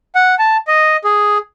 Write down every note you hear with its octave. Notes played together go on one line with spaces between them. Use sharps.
F#5
A5
D#5
G#4